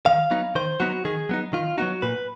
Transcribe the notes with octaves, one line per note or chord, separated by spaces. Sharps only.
D#3 F5
F#3 B3 D#4
D#3 C5
F#3 B3 D#4 F#4
D#3 G#4
F#3 B3 D#4
D#3 F4
F#3 B3 D#4 F#4
A#2 B4